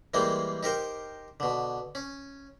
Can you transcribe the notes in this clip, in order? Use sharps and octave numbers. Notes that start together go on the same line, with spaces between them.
E3 G3 G#3 A#3 C5
D#4 G4 A#4 C5
B2 D3
C#4